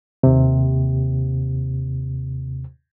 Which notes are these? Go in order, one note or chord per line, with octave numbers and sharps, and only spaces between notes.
D#2 C3